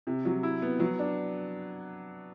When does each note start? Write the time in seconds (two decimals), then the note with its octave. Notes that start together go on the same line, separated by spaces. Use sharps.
0.07 C3
0.25 F#3
0.43 E4
0.62 B3
0.80 F#3
0.99 D4